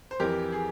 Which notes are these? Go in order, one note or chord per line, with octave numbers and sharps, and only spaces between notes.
C5
F2 E3 G4 A#4
G#4